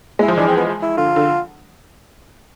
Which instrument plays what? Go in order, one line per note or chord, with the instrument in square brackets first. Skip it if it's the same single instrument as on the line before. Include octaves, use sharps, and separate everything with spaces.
[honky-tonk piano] G#3 [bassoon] E4
[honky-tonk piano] F3
[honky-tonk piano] E3 [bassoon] D4
[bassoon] C4
B3
E4
[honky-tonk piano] D3 [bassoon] F4
[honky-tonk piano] D3